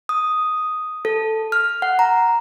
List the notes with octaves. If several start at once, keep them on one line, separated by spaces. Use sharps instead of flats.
D#6
A4
F6
F#5
A#5